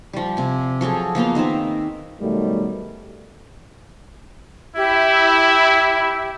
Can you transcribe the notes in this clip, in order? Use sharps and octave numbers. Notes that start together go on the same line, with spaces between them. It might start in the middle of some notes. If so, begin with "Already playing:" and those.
F3 G3
C3 G#5
F3 F#3 G#4 A4
F3 A#3 B3 F4
D#3 A#3 C4 E5
B2 D#3 F#3 G3 A3
E4 G4 E5